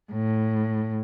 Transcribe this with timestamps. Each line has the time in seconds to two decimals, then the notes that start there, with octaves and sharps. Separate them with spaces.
0.12 A2